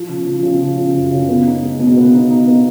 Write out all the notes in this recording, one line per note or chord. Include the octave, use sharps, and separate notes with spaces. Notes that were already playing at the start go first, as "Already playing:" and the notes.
Already playing: F3
C#3
F3
C#3
F3
C#3
F#2
C#3
B3
D#4
G#3
B2
B3
D#4
D#4
B3